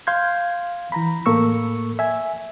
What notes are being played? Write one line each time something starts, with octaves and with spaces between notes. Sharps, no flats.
F5 C6 G6 G#6
E3 A#5 B5
A2 A#3 A4 C#6 E6
E5 G#5